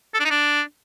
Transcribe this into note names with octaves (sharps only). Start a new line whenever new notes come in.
A4
D4
D#4
D4